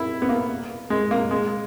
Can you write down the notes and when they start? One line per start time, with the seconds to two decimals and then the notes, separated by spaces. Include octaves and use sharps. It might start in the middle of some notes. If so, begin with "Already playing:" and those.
Already playing: E4
0.22 B3
0.29 A#3
0.90 G#3
1.11 A#3
1.31 G#3